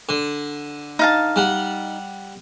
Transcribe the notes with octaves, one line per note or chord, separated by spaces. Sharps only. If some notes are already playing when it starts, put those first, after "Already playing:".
D3
D#4 F5 A5
G3 F#5